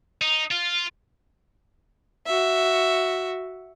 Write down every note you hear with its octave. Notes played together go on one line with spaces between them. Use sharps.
D#4
F4
F#4 E5